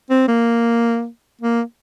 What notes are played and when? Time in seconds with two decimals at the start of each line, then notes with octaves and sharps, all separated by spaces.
0.10 C4
0.28 A#3
1.41 A#3